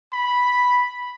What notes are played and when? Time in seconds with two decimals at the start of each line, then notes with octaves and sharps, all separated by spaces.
0.13 B5